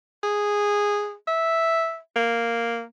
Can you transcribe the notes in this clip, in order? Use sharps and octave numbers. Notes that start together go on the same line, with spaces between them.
G#4
E5
A#3